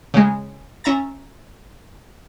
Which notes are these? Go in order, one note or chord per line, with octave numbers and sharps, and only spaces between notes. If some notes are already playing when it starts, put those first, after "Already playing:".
C#3 G#3
C#4 E5 A#5 A6